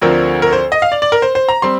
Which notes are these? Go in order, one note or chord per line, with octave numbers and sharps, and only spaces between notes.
D2 D3 F3 C4 A#4
A#4
C5
D#5
F5
D5
D5
A#4
C5
C5
A#5
G3 C4 C6